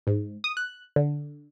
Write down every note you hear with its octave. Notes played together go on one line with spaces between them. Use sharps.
G#2
D#6
F#6
D3